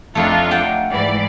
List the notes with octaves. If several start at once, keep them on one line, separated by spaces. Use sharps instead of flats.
F2 A3 D4 D#4 F4
F#5 G5 A5
G#2 E3 D5